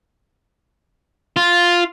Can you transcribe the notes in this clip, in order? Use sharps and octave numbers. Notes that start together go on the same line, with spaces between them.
F4